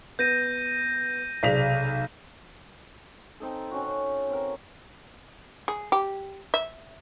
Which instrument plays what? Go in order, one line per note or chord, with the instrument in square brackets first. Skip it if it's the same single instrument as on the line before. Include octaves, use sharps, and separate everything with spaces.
[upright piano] B3 [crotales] G6 A#6 D#7
[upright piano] B1 B6 F7 [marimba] C3 G#4 D5
[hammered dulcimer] C4 D#4 A4
C#4 F#4
C4 A#4
[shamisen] G#4
G4
E5